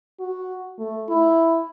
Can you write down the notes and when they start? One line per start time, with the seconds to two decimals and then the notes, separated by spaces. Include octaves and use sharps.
0.20 F#4
0.78 A3
1.09 E4